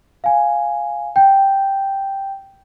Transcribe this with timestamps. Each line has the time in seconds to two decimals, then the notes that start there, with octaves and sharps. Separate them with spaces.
0.24 F5 G#5
1.16 G5 G6